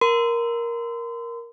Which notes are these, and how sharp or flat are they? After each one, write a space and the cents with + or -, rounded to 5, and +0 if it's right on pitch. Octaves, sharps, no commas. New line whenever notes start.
A#4 +5 C6 -35